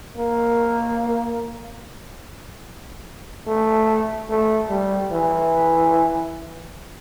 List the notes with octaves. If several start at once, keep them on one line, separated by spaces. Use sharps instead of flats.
A#3
A3
A3
G3
E3